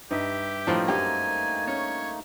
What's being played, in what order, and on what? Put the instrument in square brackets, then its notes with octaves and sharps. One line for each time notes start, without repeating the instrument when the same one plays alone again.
[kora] G2 [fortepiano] D#4 [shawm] G4 [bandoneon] E5
[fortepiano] A2 F3 [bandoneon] A3 A#3 D#4 [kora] D4 C5 G5
[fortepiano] F#2 G4 [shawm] G#5
[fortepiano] C#4 [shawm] C#5